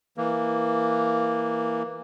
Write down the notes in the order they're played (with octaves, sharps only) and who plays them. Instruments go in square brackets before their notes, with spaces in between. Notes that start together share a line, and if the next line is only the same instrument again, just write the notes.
[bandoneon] E3 A#3